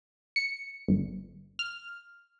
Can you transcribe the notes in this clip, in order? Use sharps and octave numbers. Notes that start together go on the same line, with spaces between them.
C#7
G1
F6